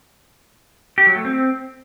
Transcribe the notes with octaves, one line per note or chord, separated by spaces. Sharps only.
G4
F#3
A3
C4